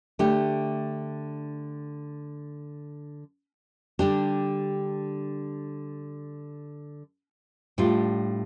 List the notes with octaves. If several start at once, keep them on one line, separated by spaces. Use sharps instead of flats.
D3 A3 D4 G4
D3 G3 D4 G4
A2 G3 D4 F4